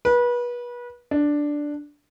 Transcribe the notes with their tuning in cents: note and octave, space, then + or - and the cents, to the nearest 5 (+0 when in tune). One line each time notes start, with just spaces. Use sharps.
B4 -30
D4 +0